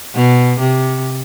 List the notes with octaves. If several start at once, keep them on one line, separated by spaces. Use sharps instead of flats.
B2
C3